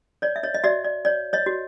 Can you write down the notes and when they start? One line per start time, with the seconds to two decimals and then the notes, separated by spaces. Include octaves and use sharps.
0.22 C#5 D5
0.36 E5
0.43 C#5 D#5
0.54 D#5
0.64 F#4 D5 E5
0.84 D5
1.05 C#5 D5
1.33 C#5 D#5
1.46 F#4